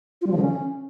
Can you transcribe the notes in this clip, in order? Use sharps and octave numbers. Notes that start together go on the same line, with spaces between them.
F4
G3
F3
D3
C#4